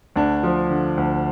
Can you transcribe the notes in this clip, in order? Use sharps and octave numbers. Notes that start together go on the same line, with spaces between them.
D2 D4
F3
D3
D2